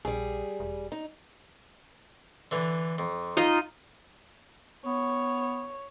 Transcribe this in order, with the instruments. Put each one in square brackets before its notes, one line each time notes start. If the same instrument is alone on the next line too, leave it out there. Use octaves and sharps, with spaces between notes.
[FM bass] A#1 [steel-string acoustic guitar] G3 G#4
[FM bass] E1
[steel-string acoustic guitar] D#4
[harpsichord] D3 E3
F2
[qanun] D#4 F4 D#5
[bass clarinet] B3 [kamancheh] C#5